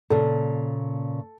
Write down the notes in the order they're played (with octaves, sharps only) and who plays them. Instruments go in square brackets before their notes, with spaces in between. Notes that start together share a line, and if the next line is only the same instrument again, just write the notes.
[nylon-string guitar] A#2 C#3 A#3 [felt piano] A4